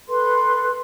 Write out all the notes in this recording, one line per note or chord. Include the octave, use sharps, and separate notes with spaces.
A4 B4 C6